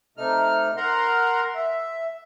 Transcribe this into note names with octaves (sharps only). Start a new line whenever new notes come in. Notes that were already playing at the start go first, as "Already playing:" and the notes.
C3 A3 D#4 F6
A#4 F#5 A#5 C6
E5